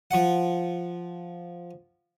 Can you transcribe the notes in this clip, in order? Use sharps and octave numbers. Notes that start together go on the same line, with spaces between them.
F3 F#5